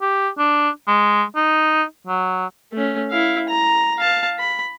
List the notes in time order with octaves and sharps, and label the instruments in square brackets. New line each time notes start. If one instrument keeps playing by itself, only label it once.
[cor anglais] G4
D4
G#3
D#4
F#3
[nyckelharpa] A3 C#4
E4 F5
A#5
F5 A5
B5